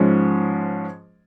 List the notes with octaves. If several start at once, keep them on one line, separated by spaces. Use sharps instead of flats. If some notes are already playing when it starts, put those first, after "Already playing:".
Already playing: G#2 F3 G#3 C#4